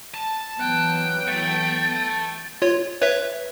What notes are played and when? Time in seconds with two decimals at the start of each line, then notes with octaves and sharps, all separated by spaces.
0.14 A5
0.59 E3 F#3 B3 G5 F#6
1.28 A3 A6
2.62 F4 C#5
3.02 B4 C#5 E5